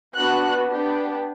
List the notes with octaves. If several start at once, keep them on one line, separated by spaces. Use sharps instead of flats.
B3 D4 F#4 F#6
B3 D4 G4